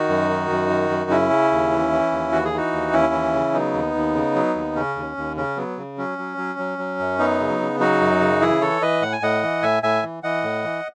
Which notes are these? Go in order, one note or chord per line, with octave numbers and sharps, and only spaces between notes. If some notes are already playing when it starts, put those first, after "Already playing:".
Already playing: D#3 D#4 F#4
F#2
D#3
F#2
D#3
F#2
C#3 C#4 E4
C#3
D#2
E3
E3
D#2
E3 F#4
G#4
E3 D#4 F#4
D#2
D#2 C#4 E4
E3
C#3
F#3 B3 D#4
D#2
D#2
C#3
F#3
D#2
C#3 C#4
D#2
D#2
C#3 C#4
F#3 B3
C#3
F#3 C#4
F#3
F#3
F#3
F#3
F#2
F#3 B3 D#4
C#3
C#3
F#3 D#4 F#4
F#2
C#3
E3 E4 G#4
E3 A4 C#5
E3 B4 D#5
A2 F#5
G#5
A2 D#5 F#5
E3
A2 E5 G#5
A2 E5 G#5
E3
E3 D#5 F#5
A2
E3